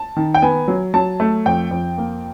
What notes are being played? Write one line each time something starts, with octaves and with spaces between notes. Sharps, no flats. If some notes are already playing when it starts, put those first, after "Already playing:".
Already playing: A5
D#3
G5
B3 G#5
F#3
F#3 A5
A3
F2 G5
F2
A#3